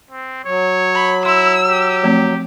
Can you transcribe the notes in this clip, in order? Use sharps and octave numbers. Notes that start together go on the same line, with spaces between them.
C4
F#3 C#5
B5
E4 C6 E6
G4
F3 A3 C4